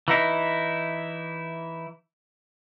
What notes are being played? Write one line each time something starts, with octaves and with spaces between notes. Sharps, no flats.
E3 D#4 E4